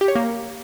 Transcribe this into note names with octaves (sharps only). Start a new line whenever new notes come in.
G4
C#5
A#3